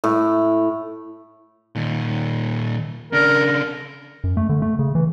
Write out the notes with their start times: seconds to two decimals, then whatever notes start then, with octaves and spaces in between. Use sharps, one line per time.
0.04 A2
1.75 A#2 D#3
3.13 C#3 D4 A#4
4.24 F#2
4.37 A3
4.49 D3
4.62 A3
4.79 C#3
4.95 E3